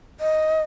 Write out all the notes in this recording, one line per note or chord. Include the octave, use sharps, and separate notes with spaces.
D#5